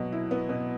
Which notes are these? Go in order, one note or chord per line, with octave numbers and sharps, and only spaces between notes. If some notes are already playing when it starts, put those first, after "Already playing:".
Already playing: B2 F#3
E4
B3
B2